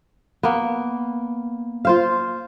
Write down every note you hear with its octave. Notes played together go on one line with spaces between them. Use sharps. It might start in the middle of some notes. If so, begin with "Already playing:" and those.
A#3 B3
F4 C5 F5